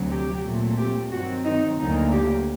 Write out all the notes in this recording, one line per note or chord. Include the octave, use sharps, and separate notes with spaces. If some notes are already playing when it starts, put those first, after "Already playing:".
Already playing: D2 C3 F#3
G4
A#2 F#3 A3 C4
G4
G2 D#3 F#3 C4 F#4
D#4
D2 D3 F#3 A#3 D#4
G4